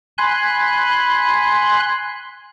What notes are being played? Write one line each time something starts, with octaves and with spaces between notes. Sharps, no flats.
G#5 B5 C6 F#6